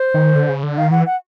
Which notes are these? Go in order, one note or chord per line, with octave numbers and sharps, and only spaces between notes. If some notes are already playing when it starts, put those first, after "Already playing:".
Already playing: C5
D#3
D3
C#3
D3
D#3 F5
E3 F#5
F#5